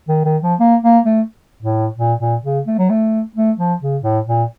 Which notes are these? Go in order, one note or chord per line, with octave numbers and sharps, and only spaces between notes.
D#3
D#3
F3
A#3
A#3
A3
A2
A#2
A#2
C#3
A3
F#3
A3
A3
F3
C#3
A2
A#2